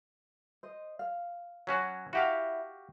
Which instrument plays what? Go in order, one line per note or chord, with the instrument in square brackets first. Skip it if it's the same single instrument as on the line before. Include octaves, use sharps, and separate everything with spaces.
[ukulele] C5 D#5
F5
[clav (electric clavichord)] F#3 C#4 F#4
[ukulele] E4 F#5 A5 [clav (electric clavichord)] F#4 G4 F5